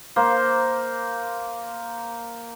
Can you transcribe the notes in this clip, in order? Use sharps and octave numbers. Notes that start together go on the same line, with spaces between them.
A#3 C5